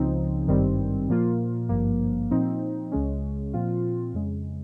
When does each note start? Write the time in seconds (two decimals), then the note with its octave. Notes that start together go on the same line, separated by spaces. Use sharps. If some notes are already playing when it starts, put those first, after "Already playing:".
Already playing: C#2 C#3 F3 C4 D#4
0.48 G#1 G2 D#3 G3 C4
1.09 A#2 F3 A#3 F4
1.69 G#1 G2 F3 A#3
2.31 A#2 F3 C4 D#4
2.92 C#2 C#3 G#3 C#4
3.53 A#2 F3 C4 F4
4.14 F2 C#3 G#3